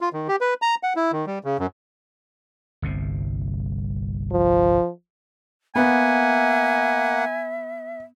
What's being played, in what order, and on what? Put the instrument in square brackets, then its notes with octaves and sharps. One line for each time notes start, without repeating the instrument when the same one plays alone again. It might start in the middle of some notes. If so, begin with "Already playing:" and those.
[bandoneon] F4
D#3
G4
B4
A#5
F#5
E4
D#3
G3
C#3
F#2
[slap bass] G1 C2 C3
[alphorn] F3
[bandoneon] A#3 F#5 [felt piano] B3 [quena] E5 [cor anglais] G#5